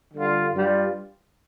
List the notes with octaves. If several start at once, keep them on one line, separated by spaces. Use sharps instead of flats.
D3 G3 F4
G2 G3 F4